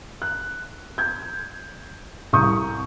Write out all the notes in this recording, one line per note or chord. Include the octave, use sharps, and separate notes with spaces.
F#6
G6 G#6
C2 A#5 C#6 D#6 G6